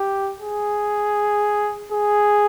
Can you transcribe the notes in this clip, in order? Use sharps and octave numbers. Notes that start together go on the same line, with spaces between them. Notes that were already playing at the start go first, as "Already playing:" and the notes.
Already playing: G4
G#4
G#4